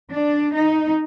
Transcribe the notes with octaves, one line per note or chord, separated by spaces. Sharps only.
D4
D#4